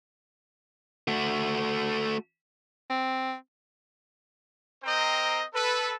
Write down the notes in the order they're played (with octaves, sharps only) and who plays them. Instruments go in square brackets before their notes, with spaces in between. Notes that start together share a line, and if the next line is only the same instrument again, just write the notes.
[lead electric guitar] A3 F#4
[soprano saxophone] C4
[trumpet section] C4 A#4 C5 D#5 G5 A#5
A4 B4